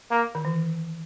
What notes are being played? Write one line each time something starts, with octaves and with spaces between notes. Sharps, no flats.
A#3
D#3
E3